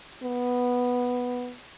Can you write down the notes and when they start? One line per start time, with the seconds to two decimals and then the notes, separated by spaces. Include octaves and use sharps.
0.23 B3